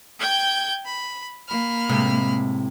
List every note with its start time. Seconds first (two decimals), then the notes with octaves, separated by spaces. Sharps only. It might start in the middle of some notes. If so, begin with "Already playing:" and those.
0.20 G5 G6 G#6
0.85 B5
1.47 A#3 B5 F6
1.89 A2 C3 G#3